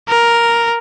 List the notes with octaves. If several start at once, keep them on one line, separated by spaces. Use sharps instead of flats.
A#4